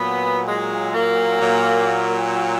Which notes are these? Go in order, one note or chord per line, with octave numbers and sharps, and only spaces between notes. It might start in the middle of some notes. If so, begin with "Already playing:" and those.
Already playing: A#2 F#3 B3
G#3
A#3
A#2 F#3